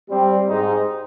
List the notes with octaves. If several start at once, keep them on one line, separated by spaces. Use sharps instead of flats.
G3 C4
G#2 D#4